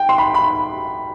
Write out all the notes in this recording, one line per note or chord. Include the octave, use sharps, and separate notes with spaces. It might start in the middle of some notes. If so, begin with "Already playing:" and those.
Already playing: G5
C6
B5
B5